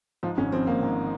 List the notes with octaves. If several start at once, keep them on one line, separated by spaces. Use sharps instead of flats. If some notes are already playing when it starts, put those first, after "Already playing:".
G#2 F3
G#1 C#4
F3 C4
G#1 A#3
G#2